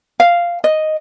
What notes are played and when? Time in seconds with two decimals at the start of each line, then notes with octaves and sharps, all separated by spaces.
0.20 F5
0.64 D#5